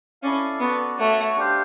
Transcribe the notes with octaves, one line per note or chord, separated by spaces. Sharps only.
C#4 E4 A4 D5 F5
B3 F#4 A4 D5
A3 F#4 A4 C#5 F#5
D4 G4 C5 F5